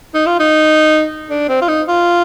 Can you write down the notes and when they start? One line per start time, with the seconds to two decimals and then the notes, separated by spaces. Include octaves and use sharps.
0.14 D#4
0.26 F4
0.40 D#4
1.30 D4
1.49 C4
1.62 F4
1.68 D#4
1.88 F4